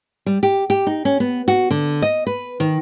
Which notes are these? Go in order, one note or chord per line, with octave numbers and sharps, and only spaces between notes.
G3
G4
G4
D#4
C#4
B3
F#4
D3
D#5
B4
D#3